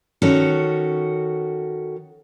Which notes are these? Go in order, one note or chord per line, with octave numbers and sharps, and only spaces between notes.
D#3 C#4 F#4 A4